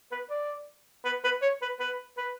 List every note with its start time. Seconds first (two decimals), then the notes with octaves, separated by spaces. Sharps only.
0.12 B4
0.30 D5
1.05 B4
1.24 B4
1.42 C#5
1.62 B4
1.80 B4
2.17 B4